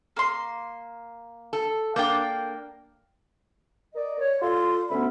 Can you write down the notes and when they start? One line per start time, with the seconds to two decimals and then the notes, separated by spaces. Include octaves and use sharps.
0.17 A#3 C6
1.53 A4
1.96 A#3 D4 G5 G6
3.93 A#4 D5 D#5
4.18 C#5
4.41 F4 A4 D5 F5 C6
4.90 D2 B3 C#4 E5 B5